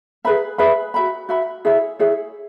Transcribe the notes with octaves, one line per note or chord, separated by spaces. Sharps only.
G#4 B4 E5 B5
G#4 B4 E5 B5
F#4 E5 B5
F#4 E5 B5
E4 G#4 C#5 E5
E4 G#4 C#5 E5